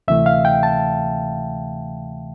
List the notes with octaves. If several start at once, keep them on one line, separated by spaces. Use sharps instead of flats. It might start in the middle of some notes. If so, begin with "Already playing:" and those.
D2 C3 E3 A3 E5
F5
G5
A5